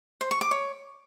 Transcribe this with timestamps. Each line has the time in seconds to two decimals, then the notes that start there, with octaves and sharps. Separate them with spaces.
0.21 C5
0.31 C#6
0.41 D6
0.51 C#5